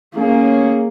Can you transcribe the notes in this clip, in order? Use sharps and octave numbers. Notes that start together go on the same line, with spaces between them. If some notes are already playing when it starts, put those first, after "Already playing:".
A#3 C#4 G#4